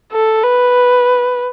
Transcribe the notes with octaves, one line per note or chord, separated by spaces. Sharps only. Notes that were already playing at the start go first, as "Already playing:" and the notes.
A4
B4